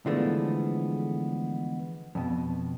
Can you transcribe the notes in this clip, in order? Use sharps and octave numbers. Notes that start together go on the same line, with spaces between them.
D3 E3 F3 G#3 A3 B3
F2 B2